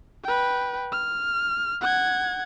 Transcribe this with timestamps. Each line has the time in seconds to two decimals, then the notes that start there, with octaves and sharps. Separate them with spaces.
0.24 B4 G5
0.92 F6
1.81 F#5 G#6